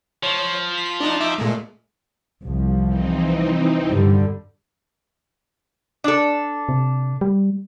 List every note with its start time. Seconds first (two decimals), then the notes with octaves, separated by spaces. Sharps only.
0.23 F3 C#5
0.78 B6
1.00 D4 D#4 A5
1.21 D#4 E5 D6
1.38 A#2 G#3 A3
2.42 C2 F3
2.86 E3 C4 D#4
3.87 G2 D3 G3
6.04 D4 A4
6.69 C3
7.21 G3